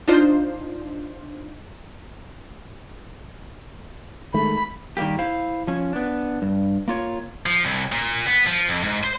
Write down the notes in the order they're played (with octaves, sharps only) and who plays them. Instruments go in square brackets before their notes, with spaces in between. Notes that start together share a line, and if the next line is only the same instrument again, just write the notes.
[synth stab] D4 D#4 F4 C5
[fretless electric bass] D#3 G#3 A3 [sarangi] B5
[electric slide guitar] D#3 G3 G#3 A#3 G4
E4 C5 F5
F3 C#4
B3 D4
G2
A#3 F4 C#5
[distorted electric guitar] F3
C2
A#2
B3
F3
F2
G#2
C5